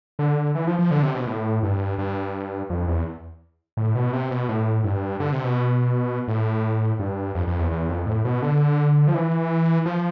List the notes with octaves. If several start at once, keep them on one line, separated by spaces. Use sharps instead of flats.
D3
E3
F3
F3
D3
C3
B2
A2
G2
G2
F2
E2
A2
B2
C3
B2
A2
G2
D3
C3
B2
A2
G2
F2
F2
E2
E2
F2
A2
B2
D3
F3
E3
F3